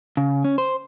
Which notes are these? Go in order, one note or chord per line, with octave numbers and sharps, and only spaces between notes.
C#3
C#4
C5